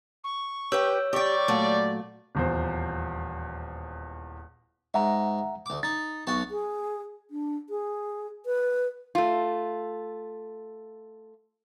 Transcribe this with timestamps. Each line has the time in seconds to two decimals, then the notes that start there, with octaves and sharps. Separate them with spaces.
0.24 C#6
0.72 G4 B4 C#5 G5 E6 G6
1.13 G3 G4 D5 G5 C#6
1.48 A#2 F#3 A3
2.35 D#1 E2 C5
4.94 G#2 E5 F#5 A#5
5.66 D2 D6
5.83 D#4 A6
6.27 B1 F#4 A5
6.49 G#4
7.31 D4
7.70 G#4
8.46 B4
9.15 A3 F4